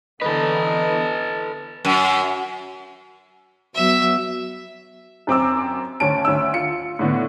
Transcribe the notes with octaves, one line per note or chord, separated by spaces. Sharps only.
D3 E3 B3 A4 B4 D#5
F#2
F#3 B3 E5
F#2 C4 D6 E6
D2 C#4 A5 D7
D2 C#4 E6
F4 C#7
A2 D3 B3